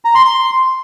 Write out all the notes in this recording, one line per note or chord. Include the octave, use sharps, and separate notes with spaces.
A#5
C6
C6